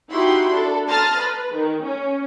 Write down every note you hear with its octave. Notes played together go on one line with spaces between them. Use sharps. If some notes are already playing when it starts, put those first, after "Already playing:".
D#4 E4 F#4 G4 B5 C6
D4 A4
A5 A#5 C6 D#6 F6 A6
B4
D#3
C#4